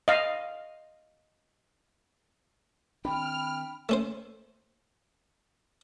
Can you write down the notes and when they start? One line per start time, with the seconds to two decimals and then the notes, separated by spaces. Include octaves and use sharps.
0.08 D#5 F5
3.05 D#3 C4 D4 G5 B5 F6
3.89 A3 C#4 C5